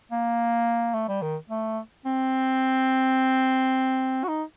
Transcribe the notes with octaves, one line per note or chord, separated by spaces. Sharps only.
A#3
A3
G3
D#3
A3
C4
F#4
D#4